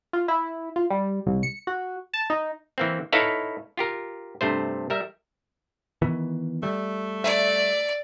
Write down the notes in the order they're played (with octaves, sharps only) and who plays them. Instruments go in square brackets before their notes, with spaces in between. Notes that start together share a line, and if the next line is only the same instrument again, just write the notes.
[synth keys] F4
E4
F4
G3
C2
C#7
F#4
A5
D#4
[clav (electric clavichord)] E3 A#3 C4
D#4 E4 A4 B4 C#5 F5
F4 G4 A#4
G2 C3 A3 C5
G3 A#4 E5
[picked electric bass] D#3 E3 B3
[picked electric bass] G3 [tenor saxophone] A3
[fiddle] D5 [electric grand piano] E5